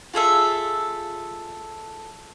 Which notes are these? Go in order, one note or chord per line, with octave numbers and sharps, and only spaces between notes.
F4 G#4 A4 E5